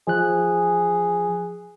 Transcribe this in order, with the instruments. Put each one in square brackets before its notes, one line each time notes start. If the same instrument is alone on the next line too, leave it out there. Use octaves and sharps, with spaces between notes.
[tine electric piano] F3 F#6 [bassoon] G#4